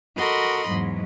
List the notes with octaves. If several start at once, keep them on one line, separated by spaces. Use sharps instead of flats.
F#4 A4 A#4 D#5 B5 C6
E2 G#2 F#3